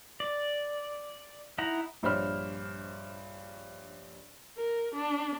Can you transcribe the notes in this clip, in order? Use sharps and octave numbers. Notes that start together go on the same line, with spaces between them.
D5
D#4 E4 F#5 A#5
A#1 G2 C5 C#5 B5 F6
A#4
D4